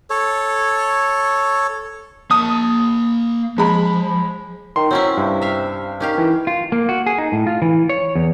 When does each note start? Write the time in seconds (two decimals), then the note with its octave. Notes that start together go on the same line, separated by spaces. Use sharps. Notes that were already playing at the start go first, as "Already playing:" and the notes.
0.10 A4 C#5
2.31 A#3 A5 D#6
3.58 F3 G#3 B5
4.76 D#3 C6
4.91 F#3 C4 C#4 E4
5.17 G2 C3
5.42 E5 F5
6.00 D#3 C#4 G4 F5
6.18 E3
6.47 F4
6.72 A#3
6.89 F#4
7.06 G#4
7.18 D#4
7.32 A2
7.47 F4
7.62 E3
7.89 C#5
8.15 E2